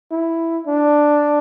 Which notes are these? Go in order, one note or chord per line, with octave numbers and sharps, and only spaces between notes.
E4
D4